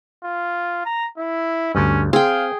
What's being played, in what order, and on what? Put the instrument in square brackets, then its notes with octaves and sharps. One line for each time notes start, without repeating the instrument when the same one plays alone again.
[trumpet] F4
A#5
E4
[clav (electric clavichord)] D2 G2 [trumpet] C#4
[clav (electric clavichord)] C4 [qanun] G#4 G5 [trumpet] F5